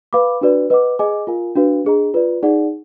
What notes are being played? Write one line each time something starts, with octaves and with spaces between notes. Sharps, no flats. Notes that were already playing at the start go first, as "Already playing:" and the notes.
B4 F5 B5 D6
D4 F#4 B4 D5
B4 D#5 F#5 D6
G#4 D#5 G#5 D6
F4 A#4 F5 G#5
D4 F#4 B4 F5
D4 G#4 D#5 A#5
F4 B4 D5
D#4 G#4 D5 F#5